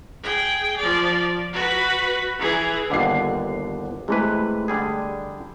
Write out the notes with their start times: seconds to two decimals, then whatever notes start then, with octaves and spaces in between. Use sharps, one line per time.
0.24 G#4 G5
0.77 F3 D5
1.53 F#4 B4
2.39 E3 G#4
2.90 G1 D#2 D3 F#5 D6 C7
4.08 C3 E3 G#3 A3 B4
4.68 D3 G3 G#4